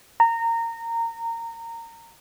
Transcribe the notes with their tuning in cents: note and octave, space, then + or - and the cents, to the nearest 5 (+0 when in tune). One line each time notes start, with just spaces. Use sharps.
A#5 -20